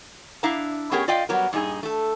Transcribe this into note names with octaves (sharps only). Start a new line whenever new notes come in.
D4 E4 E5 F5 A#5
A3 B3 C#4 G4 G#4 A#4
F4 D5 D#5 F5 G5
F#3 G3 B3 A#4
G2 A#2 D#4 G#4
A3 A4